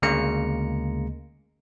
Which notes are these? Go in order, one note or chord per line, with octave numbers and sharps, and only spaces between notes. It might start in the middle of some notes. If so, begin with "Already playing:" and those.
D2 C#3 G#3 A#3 A#5 C#7